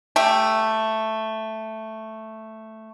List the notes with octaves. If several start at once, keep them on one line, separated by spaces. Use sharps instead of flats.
A3 G4